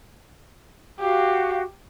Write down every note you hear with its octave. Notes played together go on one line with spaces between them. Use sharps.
F#4 G4 F5